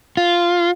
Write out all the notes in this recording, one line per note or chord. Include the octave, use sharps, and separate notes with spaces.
F4